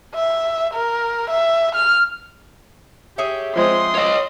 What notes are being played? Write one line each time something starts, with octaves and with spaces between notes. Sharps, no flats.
E5
A#4
E5
F6
G4 G#4 C#5 E5
F3 G#3 C4 C6 D#6
C#5 D#5